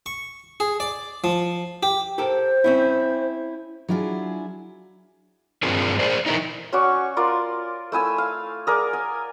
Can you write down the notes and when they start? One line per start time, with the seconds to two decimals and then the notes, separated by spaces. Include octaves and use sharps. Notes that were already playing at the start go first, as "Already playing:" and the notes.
0.06 C#6
0.60 G#4
0.80 D5
1.24 F3
1.83 G4
2.18 G4 A4 A#4 C5
2.64 C4 C#4 E4
3.89 F#3 D4 E4 F4 G4 G#4
5.63 G2 C4 D4 F4 G#4 A#4
5.99 G#4 A#4 C5 D5
6.26 D#4 E4 A#4
6.72 C#4 F#4 D5 C#6
7.17 F4 A#4 D5 C6
7.92 A3 E4 G#5 E6
8.18 F5
8.67 G#4 A#4 D5
8.93 G#5